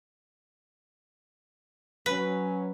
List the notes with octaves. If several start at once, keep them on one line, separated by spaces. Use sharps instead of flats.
F#3 C#4 B4